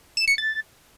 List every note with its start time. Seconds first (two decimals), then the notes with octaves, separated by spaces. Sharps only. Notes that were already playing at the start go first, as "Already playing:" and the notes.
0.17 E7
0.28 C#7
0.38 A6